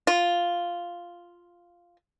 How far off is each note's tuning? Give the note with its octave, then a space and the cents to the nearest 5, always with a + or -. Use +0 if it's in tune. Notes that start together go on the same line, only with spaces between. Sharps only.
F4 +0